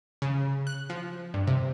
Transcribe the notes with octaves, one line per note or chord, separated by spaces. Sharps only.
C#3
F#6
F3
G2
C3